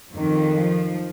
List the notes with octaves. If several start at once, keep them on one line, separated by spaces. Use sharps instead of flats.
F2 D#3
F3